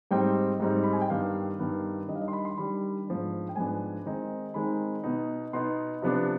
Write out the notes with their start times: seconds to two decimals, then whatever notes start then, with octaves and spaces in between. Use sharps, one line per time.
0.11 G#2 G3 C4 D#4 G5
0.60 G#2 G3 C4 D#4
0.84 B5
0.93 G#5
1.01 G5
1.10 G2 D#3 B3 F5
1.59 G2 D#3 B3
2.08 D#3 G3 D4 D#5
2.15 F5
2.21 D#5
2.28 C6
2.33 B5
2.45 C6
2.58 D#3 G3 D4 B5
3.07 G#2 F3 B3 D4
3.49 G5
3.56 G#2 F3 B3 D4 G#5
4.06 D#3 G#3 C4 D#4
4.54 D#3 G#3 C4 D#4 B5
5.04 B2 B3 D#4
5.53 B2 B3 D#4 C6
6.02 C3 F3 B3 D4